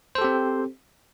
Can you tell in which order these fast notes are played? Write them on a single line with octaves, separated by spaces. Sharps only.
C5 A4 G4 C4